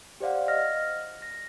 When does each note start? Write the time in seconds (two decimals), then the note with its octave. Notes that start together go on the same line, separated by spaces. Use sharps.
0.20 G4 C5 D5 F5 F#5
0.48 D#5 F6 A#6
1.22 A#6